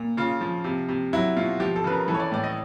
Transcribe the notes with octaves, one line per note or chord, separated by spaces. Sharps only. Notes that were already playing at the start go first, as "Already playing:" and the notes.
Already playing: A#2
C#3 F4
F3
C3
C3
F#3 E4
B2 F4
F3 G4
A4
C#3 B4
A#4
E3 A4
C#5
D5
A2 D5
D#5